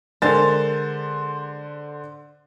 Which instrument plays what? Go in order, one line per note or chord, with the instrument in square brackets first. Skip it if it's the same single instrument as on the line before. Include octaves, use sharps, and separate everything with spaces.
[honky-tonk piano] D3 C5 A6 [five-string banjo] G#3 A#4